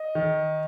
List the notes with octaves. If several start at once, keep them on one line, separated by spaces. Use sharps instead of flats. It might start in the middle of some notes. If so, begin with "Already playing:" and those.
Already playing: D#5
D#3